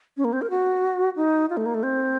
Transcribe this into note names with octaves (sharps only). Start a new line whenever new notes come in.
C#4
A#3
C4
A#4
F#4
D#4
F4
A3
A#3
A3
C4